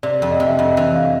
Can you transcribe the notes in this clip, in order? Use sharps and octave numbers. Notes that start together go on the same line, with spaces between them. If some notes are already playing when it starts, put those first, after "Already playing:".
C3 D5
F2
D#5
C3
E5
F2 D#5
E3 E5
F5